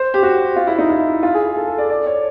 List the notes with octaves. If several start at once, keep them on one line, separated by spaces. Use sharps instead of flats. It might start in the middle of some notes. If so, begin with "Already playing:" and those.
Already playing: C5
G4
F#4
F4
E4
D#4
E4
F4
G#4
G#4
A4
A4
D5
D5
C#5